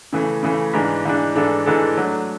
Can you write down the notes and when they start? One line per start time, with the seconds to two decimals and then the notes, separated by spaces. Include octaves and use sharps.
0.13 C#3 E3 A3
0.43 C#3 E3 A3
0.73 G#2 E3 G#3 D4
1.05 G#2 E3 G#3 D4
1.35 G#2 E3 G#3 D4 A4
1.66 G#2 E3 G#3 D4 A4
1.97 F#3 A3 D4